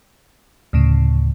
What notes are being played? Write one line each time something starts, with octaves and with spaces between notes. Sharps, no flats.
D2 A2 C#3